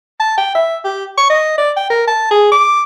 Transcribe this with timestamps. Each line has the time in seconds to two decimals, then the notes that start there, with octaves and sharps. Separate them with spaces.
0.20 A5
0.37 G5
0.55 E5
0.84 G4
1.18 C#6
1.30 D#5
1.58 D5
1.77 G5
1.90 A#4
2.07 A5
2.31 G#4
2.52 D6